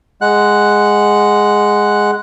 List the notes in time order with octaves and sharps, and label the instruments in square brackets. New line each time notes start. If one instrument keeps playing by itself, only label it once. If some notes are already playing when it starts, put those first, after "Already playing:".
[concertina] G#3 F#5 F#6